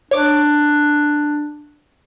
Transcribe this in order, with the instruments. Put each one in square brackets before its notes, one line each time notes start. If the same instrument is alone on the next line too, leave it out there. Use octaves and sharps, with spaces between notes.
[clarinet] D4 [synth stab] C#5 D6